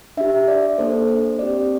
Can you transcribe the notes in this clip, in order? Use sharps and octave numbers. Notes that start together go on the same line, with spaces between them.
D4 G4 E5
D5
A#3 D4 A4 C5
C4 G4 D5